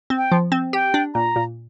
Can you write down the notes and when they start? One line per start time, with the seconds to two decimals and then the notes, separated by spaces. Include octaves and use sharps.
0.10 C4
0.17 G5
0.32 F3
0.52 C4
0.73 G4 G5
0.94 D4
1.14 A#2 A#5
1.36 A#2